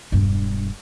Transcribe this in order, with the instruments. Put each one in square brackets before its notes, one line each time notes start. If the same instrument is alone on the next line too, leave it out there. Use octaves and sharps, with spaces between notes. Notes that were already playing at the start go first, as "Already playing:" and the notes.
[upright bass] E1 G2